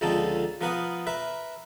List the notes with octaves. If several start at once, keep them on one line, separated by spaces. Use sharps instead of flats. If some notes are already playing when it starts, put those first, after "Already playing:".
C#2 D3 F3 C4 D#4 A4
F3 B3 A#4 B4 F5 D#6
A#4 B4 E5 B5